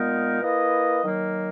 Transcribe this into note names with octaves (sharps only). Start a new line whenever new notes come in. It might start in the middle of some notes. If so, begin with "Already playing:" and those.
Already playing: A#2 G#3 B3 D#4 A#4
A#3 E4 B4 D#5
D#3 F#3 A#3